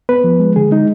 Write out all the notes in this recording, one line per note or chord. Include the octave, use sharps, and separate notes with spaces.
B3 B4
F3
G#3
D3 G#4
G#3 D#4